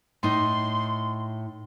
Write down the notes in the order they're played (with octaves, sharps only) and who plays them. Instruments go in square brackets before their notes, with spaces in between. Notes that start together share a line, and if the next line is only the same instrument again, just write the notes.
[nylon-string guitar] A2 D#4 [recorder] C6